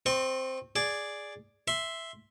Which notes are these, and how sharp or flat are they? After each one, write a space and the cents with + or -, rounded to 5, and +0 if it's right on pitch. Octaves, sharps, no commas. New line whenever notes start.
C4 +0 D#5 -40 C#6 -40
G#4 +0 D5 +0
E5 +0 C6 +0